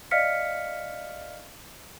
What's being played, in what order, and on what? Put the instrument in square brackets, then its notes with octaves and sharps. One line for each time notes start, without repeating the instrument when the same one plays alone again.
[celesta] D5 D#5 F5 F6 B6 C#7